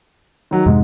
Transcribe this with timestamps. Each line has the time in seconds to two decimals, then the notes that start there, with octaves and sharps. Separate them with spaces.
0.51 D#3 F#3
0.66 F2 G#2 C3 G#3